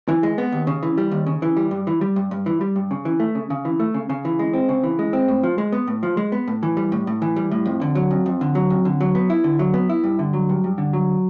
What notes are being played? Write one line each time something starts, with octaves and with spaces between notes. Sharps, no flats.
E3
G#3
B3
D#2
C#3
E3
G3
D#2
C#3
E3
G3
G2
E3
G3
G2
G2
E3
G3
G2
C#3
E3
A3
C#3
C#3
E3
A3
C#3
C#3
E3
G#3
C4
C#3
E3
G#3
C4
A2
F3
G#3
B3
A2
F3
G#3
B3
A2
E3
G3
A2
A2
E3
G3
A2
F2
D3
F#3
F2
F2
D3
F#3
F2
D3
F#3
B3
E4
D3
F#3
B3
E4
G2
D3
F#3
G2
G2
D3
F#3